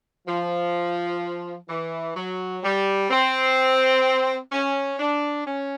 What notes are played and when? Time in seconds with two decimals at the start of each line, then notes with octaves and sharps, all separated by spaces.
0.27 F3
1.69 E3
2.15 F#3
2.63 G3
3.10 C4
4.52 C#4
4.99 D4
5.46 C#4